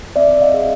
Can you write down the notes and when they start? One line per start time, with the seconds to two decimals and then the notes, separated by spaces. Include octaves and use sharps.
0.16 C4 D5 E5
0.41 D#5 F5
0.54 G#4